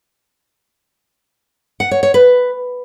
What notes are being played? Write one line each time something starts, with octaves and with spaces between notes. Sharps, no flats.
F#5
C#5
C#5
B4